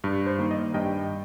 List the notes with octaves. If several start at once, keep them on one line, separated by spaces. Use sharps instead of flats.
G2
C5
D#3 A#3
D#5
G2 D#5 G5